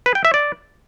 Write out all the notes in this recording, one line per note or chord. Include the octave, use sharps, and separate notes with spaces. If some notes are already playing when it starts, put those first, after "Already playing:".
B4
G5
E5
D5